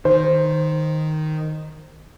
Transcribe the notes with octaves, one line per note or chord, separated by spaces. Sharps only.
D#3 C5